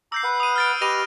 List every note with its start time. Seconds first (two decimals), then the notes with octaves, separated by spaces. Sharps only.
0.12 A#5 D6 E6 G6 C7
0.24 B4 F#5
0.40 D#6 D#7
0.56 F6 A6 D7
0.82 G4 B4 D#5 A#6 D#7 F7